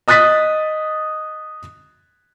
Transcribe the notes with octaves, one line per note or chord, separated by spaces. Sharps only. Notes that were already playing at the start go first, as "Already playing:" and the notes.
D#5 D#6 F#6 A6 B6